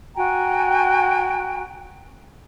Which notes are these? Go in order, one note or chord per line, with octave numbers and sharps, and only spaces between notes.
F#4 G5 G#5 A#5